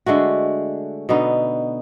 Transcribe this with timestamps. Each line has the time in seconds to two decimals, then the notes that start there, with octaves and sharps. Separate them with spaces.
0.06 D3 G#3 A3 F#4
1.09 B2 D3 B3 D#4